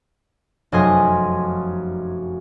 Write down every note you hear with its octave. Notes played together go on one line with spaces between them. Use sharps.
F1 F#2 D#5 G#5 C6 A#6